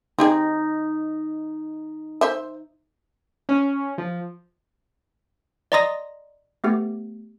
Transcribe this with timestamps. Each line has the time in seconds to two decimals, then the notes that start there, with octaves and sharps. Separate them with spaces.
0.19 C4 D#4 G4 G#4
2.21 C5 E5
3.49 C#4
3.98 F3
5.72 D5 D#5 A#5 C6 D#6 A#6
6.64 A3 B3 G4